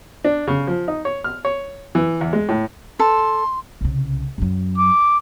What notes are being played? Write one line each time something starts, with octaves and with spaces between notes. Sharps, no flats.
D4
C#3
F3
D#4
C#5
F6
C#5
E3
E2
G#3
A2
A4 C6
C2 C#3
F#2 F#3
D6